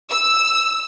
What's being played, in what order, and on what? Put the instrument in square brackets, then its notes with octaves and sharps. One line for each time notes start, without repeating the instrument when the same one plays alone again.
[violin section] E6